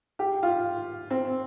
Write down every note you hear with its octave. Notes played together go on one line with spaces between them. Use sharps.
G4
F4
C4